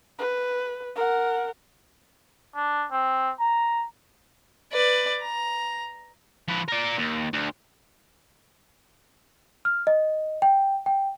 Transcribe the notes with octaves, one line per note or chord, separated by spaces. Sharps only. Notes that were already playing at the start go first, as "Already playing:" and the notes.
B4
A#4 F#5
D4
C4
A#5
B4 D5
A#5
F3 B4
A#4 D5
D#2
D2
F6
D#5
G5
G5